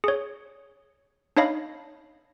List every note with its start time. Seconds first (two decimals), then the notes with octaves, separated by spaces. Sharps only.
0.04 G#4 C#5
1.37 D4 D#4 C#5 D#5 F5 B5